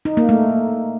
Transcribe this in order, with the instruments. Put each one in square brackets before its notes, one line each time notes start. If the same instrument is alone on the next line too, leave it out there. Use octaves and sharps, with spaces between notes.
[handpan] D#4
A#3
A3